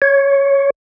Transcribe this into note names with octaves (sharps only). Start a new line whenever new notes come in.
C#5